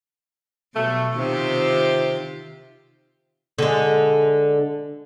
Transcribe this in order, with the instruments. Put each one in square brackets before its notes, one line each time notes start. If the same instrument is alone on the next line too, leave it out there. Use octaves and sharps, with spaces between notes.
[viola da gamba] B2 [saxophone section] F#3 G3 A3
[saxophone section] C3 [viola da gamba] D#3 F4 G4
[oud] D3 G#3